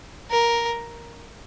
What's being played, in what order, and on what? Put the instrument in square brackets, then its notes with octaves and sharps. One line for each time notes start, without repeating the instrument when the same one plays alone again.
[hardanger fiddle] A#4